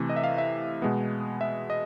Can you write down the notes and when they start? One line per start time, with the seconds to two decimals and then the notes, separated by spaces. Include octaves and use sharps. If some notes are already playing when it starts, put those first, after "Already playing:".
Already playing: C3 E3 A3
0.09 D#5
0.16 E5
0.24 F5
0.38 E5
0.82 B2 G#3 B3
1.41 E5
1.70 D#5